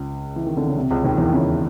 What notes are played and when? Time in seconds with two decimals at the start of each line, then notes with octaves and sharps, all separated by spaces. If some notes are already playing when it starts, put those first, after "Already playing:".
Already playing: C#2 C#3
0.36 E3
0.47 D#3
0.57 D3
0.67 C#3
0.76 C2 C3
0.91 C#2 C#3
1.04 D#2 D#3
1.18 E2 E3
1.32 C#2 C#3